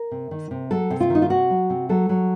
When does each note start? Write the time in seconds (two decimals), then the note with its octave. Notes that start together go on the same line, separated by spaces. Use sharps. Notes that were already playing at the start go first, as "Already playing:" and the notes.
Already playing: A#4
0.11 C3
0.31 D#3
0.51 C3
0.70 F#3 A4
0.90 C3
1.00 F4
1.10 D#3
1.15 D#4
1.22 F4
1.30 C3 F#4
1.50 F#3
1.70 C3
1.89 F#3 A4
2.09 F#3